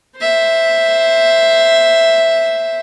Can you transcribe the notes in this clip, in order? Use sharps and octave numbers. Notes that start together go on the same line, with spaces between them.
C5 E5